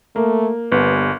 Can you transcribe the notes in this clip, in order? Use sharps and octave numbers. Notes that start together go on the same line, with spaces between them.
A3 A#3
G1 G3 B3